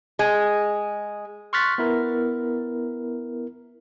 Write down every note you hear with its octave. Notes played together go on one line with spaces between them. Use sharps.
G#3
C6 C#6 F6 F#6 A6 B6
B3 E4 A#4